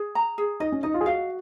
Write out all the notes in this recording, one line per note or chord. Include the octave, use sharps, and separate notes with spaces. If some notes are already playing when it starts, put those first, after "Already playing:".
Already playing: G#4
A#5
G#4
D#4 D#5
C#4
D#4 D#5
F4
G#4
F#4 F5